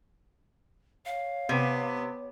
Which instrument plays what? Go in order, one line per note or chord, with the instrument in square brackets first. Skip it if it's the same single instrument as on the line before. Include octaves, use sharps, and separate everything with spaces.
[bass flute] C#5 [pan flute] F5
[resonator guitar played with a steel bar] C3 [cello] B3